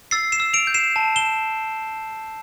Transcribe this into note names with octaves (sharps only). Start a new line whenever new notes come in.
E6 A6 C7
C7 E7
E6
D7 F7
G6
C7 E7
A5
E7 G7